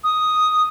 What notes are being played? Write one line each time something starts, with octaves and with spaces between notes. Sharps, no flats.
D#6